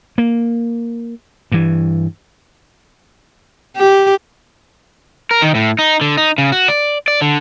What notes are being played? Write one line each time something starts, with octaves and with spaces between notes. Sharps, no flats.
A#3
G2 E3
G4
A#4
D#3
A2
D#4
D3
D#4
C#3
F#4
D5
D5
D3